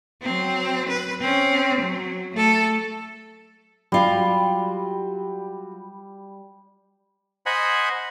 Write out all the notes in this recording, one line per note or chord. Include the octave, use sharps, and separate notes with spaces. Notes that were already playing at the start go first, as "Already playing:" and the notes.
F#3 C4
B4
C4 C#4
F#3
A3 A4
F#3 G3 F4
C5 D#5 F#5 G#5 B5